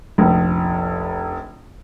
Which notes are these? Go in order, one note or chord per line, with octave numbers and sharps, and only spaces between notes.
F1 A#1